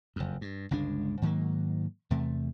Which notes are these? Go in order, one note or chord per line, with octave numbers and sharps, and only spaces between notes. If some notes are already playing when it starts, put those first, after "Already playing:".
F#1 F2
G2
G1 C#2 G#3 D4
G#2 D#3 F#3 A#3
E2 C3 A3